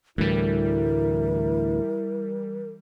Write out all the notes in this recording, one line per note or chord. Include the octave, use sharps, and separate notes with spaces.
D2 A2 E3 G3 E4 A#4